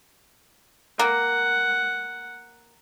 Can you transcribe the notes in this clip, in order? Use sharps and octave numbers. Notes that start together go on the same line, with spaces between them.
A#3 F#5